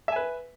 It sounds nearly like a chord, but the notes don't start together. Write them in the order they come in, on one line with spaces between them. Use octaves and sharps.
E5 G#5 B4